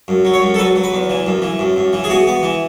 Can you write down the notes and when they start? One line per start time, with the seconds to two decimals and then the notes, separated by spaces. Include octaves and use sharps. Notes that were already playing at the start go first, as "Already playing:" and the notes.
0.08 F#2
0.25 F#3
0.34 C#5
0.42 F#2
0.54 A4
0.58 F#3 B4
0.76 F#3
0.84 B4
0.93 E2
1.10 E3
1.27 F#2
1.42 E3
1.59 F#2
1.76 F#2
1.93 E3
2.04 G#4
2.10 B3 F#4
2.27 B3
2.43 E3